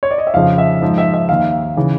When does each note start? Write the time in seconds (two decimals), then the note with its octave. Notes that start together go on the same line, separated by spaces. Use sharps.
0.03 C#5
0.11 D5
0.18 D#5
0.27 E5
0.34 F2 C#3 F3 F5
0.58 E5
0.82 G#2 F3
0.98 E5
1.14 E5
1.29 D#2 D#3 F5
1.77 C#3 E3